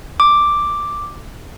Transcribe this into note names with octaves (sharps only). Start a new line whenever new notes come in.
D6